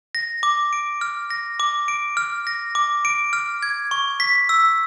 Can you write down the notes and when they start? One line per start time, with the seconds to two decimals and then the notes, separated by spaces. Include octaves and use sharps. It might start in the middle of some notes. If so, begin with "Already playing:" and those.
0.15 A#6
0.43 D6
0.73 D7
1.01 F6
1.30 A#6
1.60 D6
1.88 D7
2.17 F6
2.47 A#6
2.75 D6
3.05 D7
3.33 F6
3.63 G#6
3.91 C#6
4.20 B6
4.49 E6